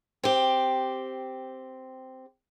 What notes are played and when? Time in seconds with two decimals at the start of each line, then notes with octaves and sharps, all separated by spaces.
0.23 C4 G4